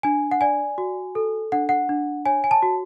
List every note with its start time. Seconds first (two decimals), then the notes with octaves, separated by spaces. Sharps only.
0.03 D4 G#5
0.31 F#5
0.41 D5 G#5
0.78 F#4
1.15 A4
1.52 D4 F#5
1.69 F#5
1.89 D4
2.25 C#5 G#5
2.44 G#5
2.51 A5
2.63 F#4